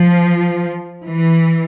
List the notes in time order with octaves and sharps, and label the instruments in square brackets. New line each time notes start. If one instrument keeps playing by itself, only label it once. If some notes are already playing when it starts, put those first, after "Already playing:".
Already playing: [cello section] F3
E3